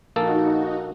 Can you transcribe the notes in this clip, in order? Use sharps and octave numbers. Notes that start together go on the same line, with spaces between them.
A#1 A#3 D#4 F#4 A4